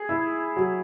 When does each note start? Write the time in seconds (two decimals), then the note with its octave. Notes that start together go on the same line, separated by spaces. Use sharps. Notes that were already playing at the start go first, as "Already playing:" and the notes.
Already playing: G#4
0.09 E4
0.56 F#3